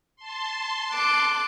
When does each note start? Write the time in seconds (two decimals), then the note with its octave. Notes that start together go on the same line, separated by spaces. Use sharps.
0.16 A5 C6
0.91 D6 F#6